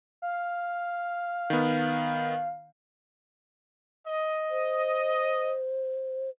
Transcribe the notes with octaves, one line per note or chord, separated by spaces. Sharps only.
F5
D#3 B3
D#5
C5